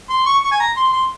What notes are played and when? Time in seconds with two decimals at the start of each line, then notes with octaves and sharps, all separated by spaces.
0.09 C6
0.26 C#6
0.43 C#6
0.51 G#5
0.60 A#5
0.77 C6
0.93 C6